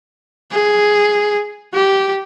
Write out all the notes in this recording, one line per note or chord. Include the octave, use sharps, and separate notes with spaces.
G#4
G4